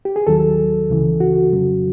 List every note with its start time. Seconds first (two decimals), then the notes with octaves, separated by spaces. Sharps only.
0.05 G4
0.16 G#4
0.27 D#2 D#3 F#3 A4
0.90 C#2 C#3 E3
1.20 F#4
1.53 F2 C#3 F#3